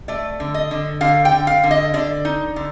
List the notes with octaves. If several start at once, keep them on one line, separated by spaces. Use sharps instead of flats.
A3 D5
D3
D#5
D3
D3 F5
G5
D3
F5
D3
D#5
D3 D5
D#4
D3